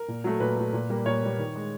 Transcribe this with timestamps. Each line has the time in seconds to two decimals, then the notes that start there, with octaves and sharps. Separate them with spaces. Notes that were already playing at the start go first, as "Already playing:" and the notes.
Already playing: A#4
0.08 A#2
0.24 F#3 A3
0.40 A#2 B4
0.56 F#3 A3
0.73 A#2
0.90 G3 A#3
1.06 A#2 C#5
1.22 G3 A#3
1.39 D#3
1.55 G#3